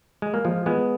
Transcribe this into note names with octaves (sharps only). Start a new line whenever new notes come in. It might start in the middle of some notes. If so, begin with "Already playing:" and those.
G#3
A#3
F3 G#3
G#3 B3